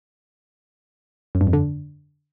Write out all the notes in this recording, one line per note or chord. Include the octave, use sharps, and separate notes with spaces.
F#2
G2
F2
D3